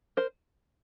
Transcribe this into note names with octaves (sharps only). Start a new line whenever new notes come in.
A#4 C5